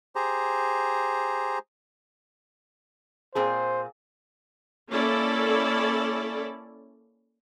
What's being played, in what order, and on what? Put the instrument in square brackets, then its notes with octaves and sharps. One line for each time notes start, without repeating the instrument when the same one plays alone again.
[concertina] G4 G#4 C5 A#5
[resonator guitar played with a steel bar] A#2 C4 G#4 [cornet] C5
[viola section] A#3 C#4 E4 A4 D5